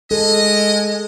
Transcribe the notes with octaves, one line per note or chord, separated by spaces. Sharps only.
G#3 A4 D#5